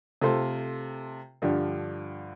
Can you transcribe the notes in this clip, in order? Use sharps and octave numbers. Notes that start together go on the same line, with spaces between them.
C3 A3 F4 A4 C5
G2 D3 F3 D4 G4